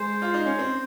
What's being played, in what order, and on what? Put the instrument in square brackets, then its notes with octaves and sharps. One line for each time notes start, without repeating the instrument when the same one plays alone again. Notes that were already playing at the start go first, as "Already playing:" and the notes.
Already playing: [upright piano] G#3 [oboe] C5
[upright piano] F4
D#4
C#4
C4